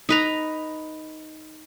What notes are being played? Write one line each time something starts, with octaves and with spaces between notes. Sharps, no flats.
D#4 B4 A#5